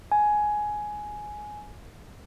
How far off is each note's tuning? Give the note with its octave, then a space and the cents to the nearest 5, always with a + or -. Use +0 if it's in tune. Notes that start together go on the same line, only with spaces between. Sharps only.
G#5 +10